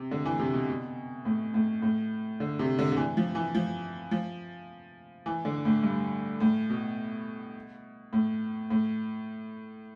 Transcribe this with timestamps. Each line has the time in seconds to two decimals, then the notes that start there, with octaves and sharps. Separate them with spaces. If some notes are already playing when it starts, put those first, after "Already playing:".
Already playing: C3
0.11 D3
0.26 E3
0.39 C3
0.54 B2
0.69 B2
1.25 A2
1.54 A2
1.82 A2
2.40 D3
2.59 C3
2.79 D3
2.92 D3
2.97 E3
3.17 F3
3.35 E3
3.55 F3
4.11 F3
5.26 E3
5.45 D3
5.65 A2
5.83 G2
6.40 A2
6.70 B2
8.13 A2
8.70 A2